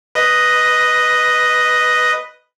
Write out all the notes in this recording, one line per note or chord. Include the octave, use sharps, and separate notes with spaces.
B4 D#5